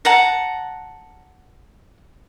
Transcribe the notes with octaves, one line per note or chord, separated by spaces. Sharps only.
F#5 A5 A#5